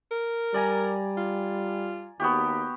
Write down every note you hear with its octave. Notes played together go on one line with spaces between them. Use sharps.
A#4
G3 D5 G#5 A#5
F4
D#2 B3 F#4 G4